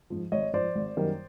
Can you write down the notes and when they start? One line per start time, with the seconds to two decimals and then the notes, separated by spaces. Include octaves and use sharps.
0.10 G#2 F3
0.32 G#1 C#5 D#5
0.53 G#2 F3 C5 D5
0.75 G#1
0.97 F#2 D#3 G3 A#3